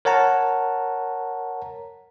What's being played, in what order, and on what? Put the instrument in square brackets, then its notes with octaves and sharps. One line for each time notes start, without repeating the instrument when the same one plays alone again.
[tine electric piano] A#4 C#5 F#5 A5 A#5